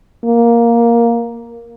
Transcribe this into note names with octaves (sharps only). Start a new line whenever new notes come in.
A#3